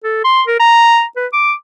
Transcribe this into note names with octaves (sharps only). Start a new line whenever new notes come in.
A4
C6
A#4
A#5
B4
D6